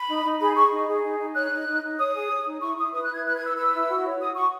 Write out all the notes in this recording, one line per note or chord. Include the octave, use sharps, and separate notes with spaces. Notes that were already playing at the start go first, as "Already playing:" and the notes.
Already playing: B5
D#4
D#4
G#4 B5
G#4 C#6
D#4
G#4
D#4
D#4
C#5 F#6
D#4
D#4
D#4
C#5 D#6
G#4
C#5
D#4
E4 C#6
E4 D#6
B4 D#6
F#6
E4 G#6
B4 F#6
G#6
B4 E6
B4 E6
E4
F#4
C#5
F#4 D#6
F#4 C#6